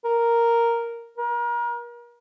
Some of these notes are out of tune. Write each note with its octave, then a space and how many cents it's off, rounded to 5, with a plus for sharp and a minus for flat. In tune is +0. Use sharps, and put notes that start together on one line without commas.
A#4 +0
A#4 +35